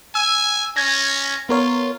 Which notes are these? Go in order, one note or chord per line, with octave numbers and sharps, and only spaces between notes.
G#5 E6
C#4 G#6 A#6
B3 F4 A#4 C#5